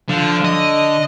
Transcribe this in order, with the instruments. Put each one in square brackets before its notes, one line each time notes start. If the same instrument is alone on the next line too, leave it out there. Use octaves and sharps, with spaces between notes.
[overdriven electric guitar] D3 [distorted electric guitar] F3
[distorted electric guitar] D#5